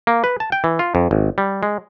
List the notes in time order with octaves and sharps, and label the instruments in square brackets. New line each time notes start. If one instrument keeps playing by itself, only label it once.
[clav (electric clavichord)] A#3
B4
A5
G5
E3
F4
F2
G#1
G3
G#3